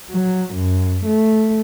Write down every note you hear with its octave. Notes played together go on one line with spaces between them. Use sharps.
F#3
F#2
A3